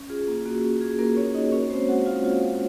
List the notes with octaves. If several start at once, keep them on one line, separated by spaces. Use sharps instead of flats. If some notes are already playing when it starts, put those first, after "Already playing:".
Already playing: C#4
F4 G#4
A#3
A#3 F#4
C#4
F4 G#4
A#3 A#4
A#3 C#4 C#5
C#4 D#4 D#5
C#4 F#4 C#5
G#3 C4 C5
G#3 F#4 F#5
D#4 F4 F5
F4 F#4 F5
G#3